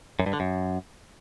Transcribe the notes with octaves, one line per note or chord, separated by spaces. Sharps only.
F#2
G2
D3
F#2